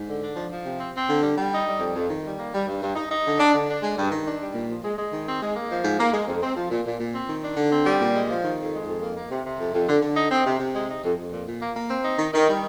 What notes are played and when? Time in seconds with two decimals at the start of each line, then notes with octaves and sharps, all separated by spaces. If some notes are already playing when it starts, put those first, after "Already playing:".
Already playing: G#2
0.08 D3
0.22 D4
0.36 F3
0.51 F3
0.65 C3
0.80 C4
0.94 C4
1.09 D3
1.23 G3
1.37 G3
1.52 D#4
1.67 G3
1.80 F2
1.95 F2
2.10 D#3
2.24 G3
2.38 A#3
2.52 G3
2.68 G2
2.81 G2
2.95 D#4
3.10 D#4
3.25 D3
3.39 D4
3.53 D3
3.68 D4
3.83 G#3
3.97 G2
4.11 D#3
4.26 D4
4.40 G3
4.55 A#2
4.69 F3
4.84 G#3
4.98 G#3
5.12 D#3
5.27 C4
5.41 G#3
5.55 A#3
5.70 F3
5.84 G#2
5.99 A#3
6.13 G#3
6.27 F2
6.42 C4
6.56 F3
6.70 A#2
6.85 A#2
7.00 A#2
7.14 C4
7.29 D#3
7.43 D4
7.57 D3
7.72 C4
7.86 G3
8.00 A#2
8.15 G#3
8.29 F3
8.43 D#3
8.58 F2
8.73 G#3
8.87 F2
9.01 A#3
9.16 A#3
9.30 C3
9.45 C3
9.59 F2
9.73 F2
9.88 D3
10.02 D3
10.16 D#4
10.31 C4
10.46 C3
10.59 C3
10.74 G#3
10.89 D#4
11.04 F2
11.18 F2
11.33 A#2
11.47 A#2
11.61 A#3
11.75 A#3
11.89 C4
12.04 D#4
12.19 D#3
12.33 D#3
12.48 G3